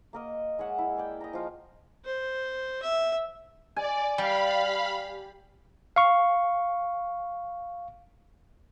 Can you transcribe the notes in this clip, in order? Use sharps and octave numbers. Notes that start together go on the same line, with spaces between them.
A#3 A#4 D#5
G#3 C#5 E5 F#5
E4
G#4 D5 G5
D#5 A#5
F3 F4 A#5
C5
E5
D5 G#5
G3 F5 B5
F5 C#6